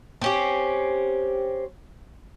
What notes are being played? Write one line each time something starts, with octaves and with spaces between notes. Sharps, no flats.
C4 C#4 G4